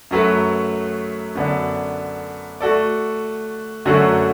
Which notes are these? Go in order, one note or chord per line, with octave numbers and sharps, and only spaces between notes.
F#2 F#3 A3 F#4 B4
F#2 D3 B3 D4
A3 F#4 A4 D5
F#2 D3 F#3 A3 F#4